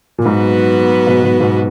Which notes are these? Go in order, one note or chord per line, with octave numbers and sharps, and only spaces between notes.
A#2
G#2 F#3 B3 F#4 B4
G#2 B2
G#2 B2
G#2 B2